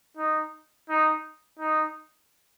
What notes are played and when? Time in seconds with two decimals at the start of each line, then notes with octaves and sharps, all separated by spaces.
0.17 D#4
0.89 D#4
1.59 D#4